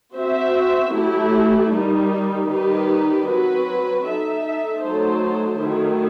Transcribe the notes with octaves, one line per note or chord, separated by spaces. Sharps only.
C4 F#4 C5 E5
F#3 A3 E4 G4
D#3 G3 D#4
D#3 G3 D#4 G4 B4
F#3 C4 F#4 B4
D#4 A4 E5
F#3 A3 D#4 A4 C5
D#3 F#3 A3 E4